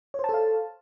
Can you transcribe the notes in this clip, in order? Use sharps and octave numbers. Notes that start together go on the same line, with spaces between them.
A4 C5 C#5 F5 A5